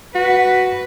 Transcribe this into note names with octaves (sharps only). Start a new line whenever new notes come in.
F#4 B4